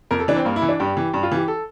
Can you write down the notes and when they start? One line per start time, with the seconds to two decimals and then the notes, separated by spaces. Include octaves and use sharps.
0.11 F2 A#4
0.20 A4
0.28 E3 D4
0.36 C4
0.45 G2 A#3
0.56 E4
0.62 E3
0.69 D4
0.80 G2 G4
0.97 E3
1.14 G2
1.23 F4
1.32 E3 G4
1.48 A4